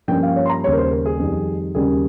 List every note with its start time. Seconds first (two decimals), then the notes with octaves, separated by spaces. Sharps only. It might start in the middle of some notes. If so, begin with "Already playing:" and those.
0.08 G2 F3 A#3 C#4 G5
0.23 F5
0.36 C#5
0.46 C6
0.50 A#5
0.64 D#2 C#3 G3 C#5
0.72 A#4
0.78 C5
0.91 A#4
1.06 G#4
1.19 F2 D#3 G3
1.75 D#2 C#3 G3 A#3 C#4 G#4